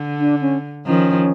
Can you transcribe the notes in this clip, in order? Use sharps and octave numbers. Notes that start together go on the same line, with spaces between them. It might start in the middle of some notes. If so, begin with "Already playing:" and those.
Already playing: D3
D4
C#4
D#3 F3 C#4